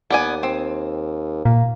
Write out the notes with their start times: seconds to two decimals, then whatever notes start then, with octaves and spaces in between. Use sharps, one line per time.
0.10 D#2 B3 D5 G#5
0.43 C4
1.45 A#2 A#3